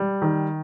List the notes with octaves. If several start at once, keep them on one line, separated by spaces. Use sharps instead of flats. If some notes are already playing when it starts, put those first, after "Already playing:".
Already playing: G3
D#3